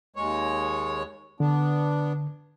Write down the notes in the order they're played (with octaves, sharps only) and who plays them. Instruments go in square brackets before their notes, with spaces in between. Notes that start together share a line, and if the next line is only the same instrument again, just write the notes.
[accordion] D#2 G#3 C#5
[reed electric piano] D3 [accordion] B3 D4